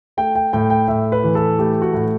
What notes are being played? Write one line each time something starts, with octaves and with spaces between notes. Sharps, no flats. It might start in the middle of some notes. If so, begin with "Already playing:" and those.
A3 G5
G5
A2 G5
G5
A2 E5
B4
E3
A4
A3 G4
F#4
A2